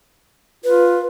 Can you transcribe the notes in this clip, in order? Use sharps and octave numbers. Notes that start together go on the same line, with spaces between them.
F4 B4